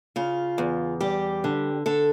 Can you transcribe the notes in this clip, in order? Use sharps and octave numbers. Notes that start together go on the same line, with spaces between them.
C#3 F4
E2
G3 G4
D3
D3 A4